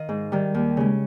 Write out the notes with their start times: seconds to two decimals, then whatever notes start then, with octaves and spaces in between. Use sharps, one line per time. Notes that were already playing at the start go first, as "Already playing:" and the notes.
Already playing: D#3 D#5 F5
0.09 G#2
0.32 D#3 G3
0.54 D#2
0.77 C#3 G#3